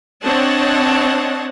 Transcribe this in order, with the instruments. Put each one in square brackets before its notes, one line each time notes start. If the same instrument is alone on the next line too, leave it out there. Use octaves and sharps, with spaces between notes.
[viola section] C4 D4 C#5 D#5 F#5 A5